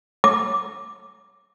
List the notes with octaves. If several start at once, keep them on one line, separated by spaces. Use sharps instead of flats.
D6